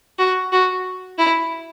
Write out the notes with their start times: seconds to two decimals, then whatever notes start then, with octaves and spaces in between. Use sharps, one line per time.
0.19 F#4
0.52 F#4
1.18 E4